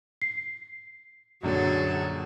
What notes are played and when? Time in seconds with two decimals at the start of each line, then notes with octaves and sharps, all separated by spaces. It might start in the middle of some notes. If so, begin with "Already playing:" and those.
0.22 C7
1.43 A#1 F#2 D3 F#3 G#4 A4